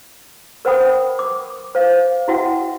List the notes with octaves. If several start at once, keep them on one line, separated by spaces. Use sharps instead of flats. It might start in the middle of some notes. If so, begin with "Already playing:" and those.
A#4 C5 F#5 G5 B5 D#6
D6
C5 F5
E4 F#4 E5 F#5 G5